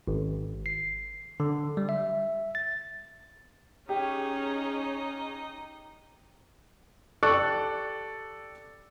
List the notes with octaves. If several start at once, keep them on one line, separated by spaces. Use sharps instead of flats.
G#1
C7
D3
G3
E5
A6
C#4 D#4 G4 G#4 C#5
G4 A4 D5 C#6 F#6